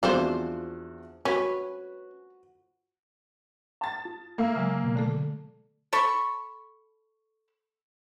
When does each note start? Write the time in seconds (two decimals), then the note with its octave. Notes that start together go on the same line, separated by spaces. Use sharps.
0.03 E2 F3 C4 D4 F4 F#4 C5
1.25 C#4 F#4 B4
3.81 A5 A6
4.05 F4
4.38 A#3 E5 F5 E6
4.55 C#3 F#3 G#3 G#5 A#5 E6
4.84 B2
4.96 D3 A3 A4
5.93 A4 A5 B5 C#6